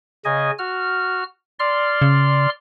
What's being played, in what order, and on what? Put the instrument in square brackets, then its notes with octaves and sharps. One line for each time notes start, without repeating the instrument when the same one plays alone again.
[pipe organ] C#3 D#5 G#5
F#4 F6
D5 C6 F6
[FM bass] C#3